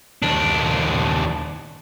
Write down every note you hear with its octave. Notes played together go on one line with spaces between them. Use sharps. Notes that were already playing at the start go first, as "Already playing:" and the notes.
D#2 D4